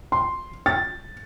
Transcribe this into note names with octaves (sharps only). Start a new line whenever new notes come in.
C6
A6